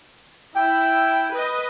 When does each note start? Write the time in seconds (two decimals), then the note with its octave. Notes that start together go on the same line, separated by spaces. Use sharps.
0.56 E4 G5
1.34 B4 D#5